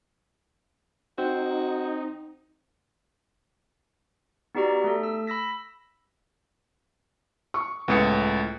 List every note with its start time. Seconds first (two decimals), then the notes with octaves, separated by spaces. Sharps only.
1.18 C4 D#4 F#4 C5
4.55 B3 D#4 F#4 G4 D5 A#5
4.84 A3 A4
5.03 E6
5.27 B5 E6 A#6 B6
7.54 C#6
7.88 C#2 A2 B3 C#7